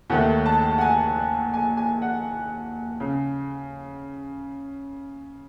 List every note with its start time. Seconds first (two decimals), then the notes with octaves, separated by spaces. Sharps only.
0.10 D#2 D#3 A3 F#5
0.46 A5
0.78 F#5
0.81 G#5
1.54 G#5
1.77 G#5
2.02 F#5
3.00 C#3